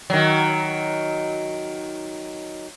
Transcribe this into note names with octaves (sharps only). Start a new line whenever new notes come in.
D#3 F#3